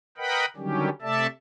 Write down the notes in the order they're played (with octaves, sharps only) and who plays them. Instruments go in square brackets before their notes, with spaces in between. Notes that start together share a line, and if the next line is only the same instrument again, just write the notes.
[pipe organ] A#4 B4 D#5 F#5 G5 B5
D3 D#3 F#3 G3 C#4 G4
C3 A3 A4 D5 E5 A5